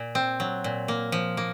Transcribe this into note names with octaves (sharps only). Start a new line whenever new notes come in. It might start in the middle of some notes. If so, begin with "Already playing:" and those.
Already playing: A#2
C4
F#3
A#2
A#3
F3
A#3